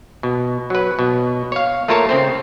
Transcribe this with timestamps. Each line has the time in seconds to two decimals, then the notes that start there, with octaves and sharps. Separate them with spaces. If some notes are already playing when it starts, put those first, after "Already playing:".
0.23 B2
0.70 F#3 B4
0.99 B2
1.52 C#5 F5
1.88 A3 A#3 F4 A#4 C#5 A5
2.09 C#3 C4 C5